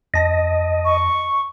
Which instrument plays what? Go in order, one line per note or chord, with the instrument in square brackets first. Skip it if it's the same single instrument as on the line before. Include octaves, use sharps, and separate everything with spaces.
[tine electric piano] F2 A5 A#6 [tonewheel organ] D#5
[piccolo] C#6